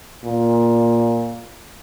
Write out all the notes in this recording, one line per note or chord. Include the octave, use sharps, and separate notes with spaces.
A#2